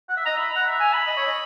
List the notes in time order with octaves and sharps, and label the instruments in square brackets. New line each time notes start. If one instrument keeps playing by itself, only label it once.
[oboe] F#5
E5
[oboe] D#5 [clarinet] A#5
[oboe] E5 [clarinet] B5
[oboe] F#5 [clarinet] A#5
[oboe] E5
[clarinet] G#5
B5
[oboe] D#5
C#5
D#5